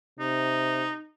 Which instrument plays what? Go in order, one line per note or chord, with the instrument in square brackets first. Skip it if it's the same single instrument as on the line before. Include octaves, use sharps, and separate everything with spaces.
[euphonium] C3 [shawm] D#4